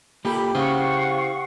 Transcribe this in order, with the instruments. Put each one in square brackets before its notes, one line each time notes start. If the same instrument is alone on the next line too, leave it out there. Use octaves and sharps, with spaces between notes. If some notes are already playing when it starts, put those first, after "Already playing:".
[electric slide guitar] A#3 F4 A4 [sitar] G4 [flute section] B5
[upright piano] C#3 [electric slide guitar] E4 C5 [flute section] F5 F#5 C#6